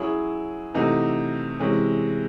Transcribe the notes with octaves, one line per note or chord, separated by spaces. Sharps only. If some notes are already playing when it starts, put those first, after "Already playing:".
Already playing: F#3 C#4 E4 G#4
C3 E3 A3 D#4 F#4
C3 E3 G#3 C#4